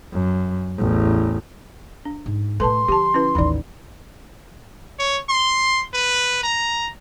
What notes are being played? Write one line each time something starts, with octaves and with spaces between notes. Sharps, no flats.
F#2
A1 E2
D4
G#2
A2 A3 A4 B4 A5 C6
D3 F3 G4 A5
C#4 E4 B4
A1 D#2 E3 D#4 D5
C#5
C6
B4
A#5